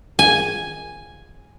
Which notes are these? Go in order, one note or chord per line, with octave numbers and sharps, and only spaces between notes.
G#5